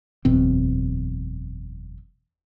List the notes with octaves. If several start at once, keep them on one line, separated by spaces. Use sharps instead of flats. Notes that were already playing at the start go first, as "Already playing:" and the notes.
F#1 E2 B2 C4